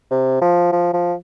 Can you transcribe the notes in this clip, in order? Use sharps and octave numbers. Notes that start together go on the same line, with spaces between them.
C3
F3
F3
F3